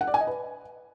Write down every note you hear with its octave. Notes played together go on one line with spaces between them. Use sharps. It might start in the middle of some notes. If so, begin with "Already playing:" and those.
F#5
D5
G#5
D#5
B4